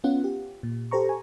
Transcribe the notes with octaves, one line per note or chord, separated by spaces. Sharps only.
B3 C#4 F4 F#5
G4
A#2
G4 A4 C5 A#5 C#6
G#5